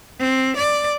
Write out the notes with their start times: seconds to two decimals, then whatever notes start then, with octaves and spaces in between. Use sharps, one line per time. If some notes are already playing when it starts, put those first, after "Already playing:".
0.19 C4
0.57 D5